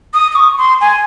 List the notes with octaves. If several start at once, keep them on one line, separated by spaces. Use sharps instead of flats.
D#6
D#6
C#6
C6
G#5